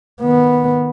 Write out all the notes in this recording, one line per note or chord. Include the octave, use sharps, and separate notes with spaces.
D#3 B3